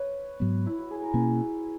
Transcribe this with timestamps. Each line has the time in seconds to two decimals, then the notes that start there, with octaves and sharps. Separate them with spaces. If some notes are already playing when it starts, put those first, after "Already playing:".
Already playing: B4 C#5
0.40 G#2 F#3 B3
0.66 E4
0.79 F#4
0.91 G#4
1.02 A#4
1.14 B2 A#3 C#4 B4